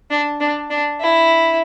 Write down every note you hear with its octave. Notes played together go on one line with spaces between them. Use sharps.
D4
D4
D4
E4